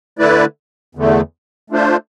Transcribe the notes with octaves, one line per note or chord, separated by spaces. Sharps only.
D3 A3 E4 B4 D5
E2 D3 A3
A3 D4 F4 C5